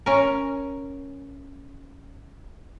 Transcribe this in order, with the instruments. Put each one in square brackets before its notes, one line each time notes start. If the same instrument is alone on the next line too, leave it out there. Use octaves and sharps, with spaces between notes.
[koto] C#4 A#4